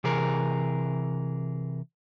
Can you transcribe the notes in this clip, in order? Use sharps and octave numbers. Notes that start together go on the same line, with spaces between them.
C3 E3 G#4 A#4